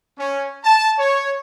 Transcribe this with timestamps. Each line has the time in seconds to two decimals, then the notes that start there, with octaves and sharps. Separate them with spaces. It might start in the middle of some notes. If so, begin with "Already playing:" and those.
0.18 C#4
0.64 A5
0.99 C#5